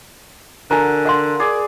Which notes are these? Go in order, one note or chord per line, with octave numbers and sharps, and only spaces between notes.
D3 F#4 A#4 G#5 A#5
F5 F#5 C6
G#4 D5 D6